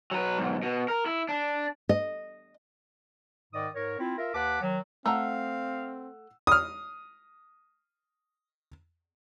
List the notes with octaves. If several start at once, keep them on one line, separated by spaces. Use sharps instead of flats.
F#3 B4
B1 G#2
B2
A#4
E4
D4
D#5
G#2 D#3 D5 D#5 D#6
G#2 A#4 C#5
C4 E4 F4
F4 A#4 E5
D#2 B4 F#5 A5 D6
D#3 F#3
A3 C4 F5 F#5 A#5 E6
D#6 F6